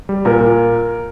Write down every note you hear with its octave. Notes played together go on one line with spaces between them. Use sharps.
G3
A#2 A#4
A#2